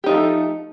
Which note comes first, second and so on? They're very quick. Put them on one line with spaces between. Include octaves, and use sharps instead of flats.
G4 D#4 F3 A3